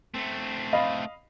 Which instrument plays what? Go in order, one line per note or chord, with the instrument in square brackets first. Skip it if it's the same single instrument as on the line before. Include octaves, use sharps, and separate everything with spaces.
[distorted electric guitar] A3 C4
[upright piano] D#5 F5 B5